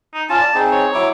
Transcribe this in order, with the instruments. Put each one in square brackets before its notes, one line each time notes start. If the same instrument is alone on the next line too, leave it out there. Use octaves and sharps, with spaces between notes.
[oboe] D#4
[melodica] C#4 F4 [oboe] A5
[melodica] D5
C4 D#4 G#4
[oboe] C#5
[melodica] F#3 E4 D6